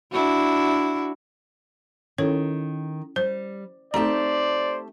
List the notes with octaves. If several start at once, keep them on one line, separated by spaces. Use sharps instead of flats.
D4 E4 F#4
D#3 C#4 E4 A4 C#5
G3 C5
A3 C4 D#4 G4 C5 D5 A5 A#5